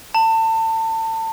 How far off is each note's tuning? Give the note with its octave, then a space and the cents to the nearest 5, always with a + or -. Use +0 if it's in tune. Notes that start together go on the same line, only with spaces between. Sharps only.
A5 +30